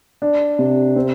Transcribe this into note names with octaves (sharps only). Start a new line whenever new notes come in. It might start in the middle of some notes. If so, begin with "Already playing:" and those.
D4
C3
C4